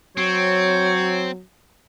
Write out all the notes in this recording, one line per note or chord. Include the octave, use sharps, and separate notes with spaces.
F#3 C4 C#5